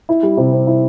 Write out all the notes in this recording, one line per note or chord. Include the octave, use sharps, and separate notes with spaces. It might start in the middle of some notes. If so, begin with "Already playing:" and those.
E4
G3
C3
C4
E4